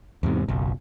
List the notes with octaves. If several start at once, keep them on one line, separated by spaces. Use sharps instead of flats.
E2 G#2 C3
F#1 B1